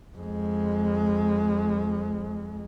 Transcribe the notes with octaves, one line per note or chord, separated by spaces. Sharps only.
F2 G#3